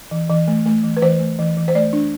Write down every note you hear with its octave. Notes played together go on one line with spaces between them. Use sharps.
E3
E3
A3
A3
E3
B4
E3 C5
A3
E3
E3
C5
A3 D5
D4